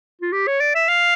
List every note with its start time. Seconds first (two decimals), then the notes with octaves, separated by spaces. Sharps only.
0.22 F4
0.32 G4
0.47 C#5
0.60 D5
0.75 E5
0.88 F5